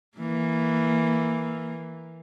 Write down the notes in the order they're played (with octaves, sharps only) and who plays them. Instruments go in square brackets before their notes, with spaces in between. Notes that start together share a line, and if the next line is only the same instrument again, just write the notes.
[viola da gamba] E3 A#3